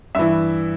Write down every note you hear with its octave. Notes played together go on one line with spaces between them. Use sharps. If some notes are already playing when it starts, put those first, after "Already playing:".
G2 E3 E5